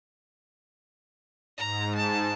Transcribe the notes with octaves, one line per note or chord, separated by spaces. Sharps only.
G#2 A#5
A5